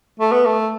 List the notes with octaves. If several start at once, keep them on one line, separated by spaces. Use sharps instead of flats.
A3
B3
A3